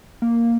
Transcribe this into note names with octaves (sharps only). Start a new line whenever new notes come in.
A#3